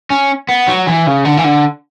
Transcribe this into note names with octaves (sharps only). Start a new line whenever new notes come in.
C#4
B3
F#3
E3
C#3
D3
E3
D3